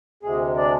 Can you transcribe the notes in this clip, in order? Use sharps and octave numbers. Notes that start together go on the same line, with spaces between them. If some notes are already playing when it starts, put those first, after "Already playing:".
D2 C3 G#3 G#4
D4 D5